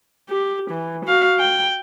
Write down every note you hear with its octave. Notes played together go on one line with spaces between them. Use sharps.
G4
E3
F#4 F5
G5